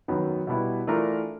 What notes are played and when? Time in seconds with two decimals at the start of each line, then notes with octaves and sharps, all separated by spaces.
0.08 F#2 D#3 F#3 B3
0.47 B2 G3 B3 E4
0.87 E3 A3 D4 F4 A#4